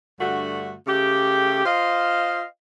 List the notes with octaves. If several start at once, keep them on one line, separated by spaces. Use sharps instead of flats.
G2 D3 A3 F#4
C#3 A3 G4
F4 C5 D#5 F5